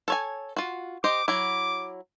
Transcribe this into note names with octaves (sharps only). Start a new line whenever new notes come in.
A4 C#5 G#5
F4 F#4
G4 C5 D#5 D6
F#3 E4 D6